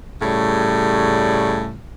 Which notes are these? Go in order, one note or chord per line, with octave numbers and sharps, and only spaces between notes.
A2 C#3 G3